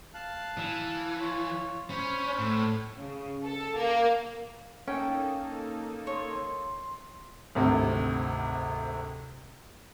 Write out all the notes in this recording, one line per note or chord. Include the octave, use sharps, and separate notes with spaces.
F5 A5 F#6
E3
F4 C#5
C#4 C5 C#5 B5
A2
C#3
A4
A#3
A#3 C#4 D#4 A4 G5
C#5 C6
G#1 D2 C3